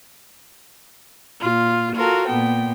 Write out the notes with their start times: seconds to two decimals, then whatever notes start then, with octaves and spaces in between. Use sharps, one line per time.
1.40 A#2 F4
1.95 F4 F#4 A4 A#4
2.28 A#2 B3 G5